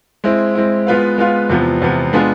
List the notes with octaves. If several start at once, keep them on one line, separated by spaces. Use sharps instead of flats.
G#3 C4 E4
G#3 C4 E4
G#3 B3 F4 B4 F5
G#3 B3 F4 B4 F5
E2 C3 F3 B3
E2 C3 F3 B3
G#3 B3 D4 F4 G#4